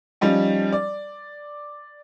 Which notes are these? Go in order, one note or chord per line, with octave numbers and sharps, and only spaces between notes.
F3 G3 C#4 D#4
D5